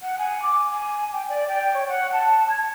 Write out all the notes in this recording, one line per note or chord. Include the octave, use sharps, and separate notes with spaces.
F#5
G#5
D6
G#5
G5
D5
G5
C#5
F#5
A5
G#6